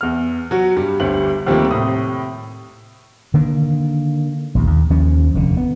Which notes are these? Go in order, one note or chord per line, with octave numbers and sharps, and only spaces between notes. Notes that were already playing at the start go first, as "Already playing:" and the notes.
E2 F6
F#3 F#4
G2 G3
G1 D2 G3 F#7
D#2 F3 G3 A3 A#3 C4
A2 C3 D#6
D3 D#3 A#3
A#1 D#2
D#2
D#2 F3 C#4
F1 D3
B3